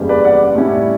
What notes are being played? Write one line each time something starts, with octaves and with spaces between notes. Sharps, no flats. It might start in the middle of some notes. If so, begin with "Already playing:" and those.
Already playing: F#1 E2 C#3 G3
B4 D5
D5 F#5
A2 G3 C#4 E4